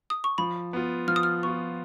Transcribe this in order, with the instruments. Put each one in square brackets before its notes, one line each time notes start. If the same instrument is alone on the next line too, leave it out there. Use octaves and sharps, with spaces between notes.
[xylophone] D#6
C#6
[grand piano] F3 [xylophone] B5
[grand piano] B3 F4
[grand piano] F3 [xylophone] F6
[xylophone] D#6
F6
[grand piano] B3 F4 [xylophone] C#6